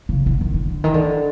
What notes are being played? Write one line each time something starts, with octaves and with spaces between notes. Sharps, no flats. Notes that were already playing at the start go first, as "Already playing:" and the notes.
C#3
D3
D#3
D3
D#3
D3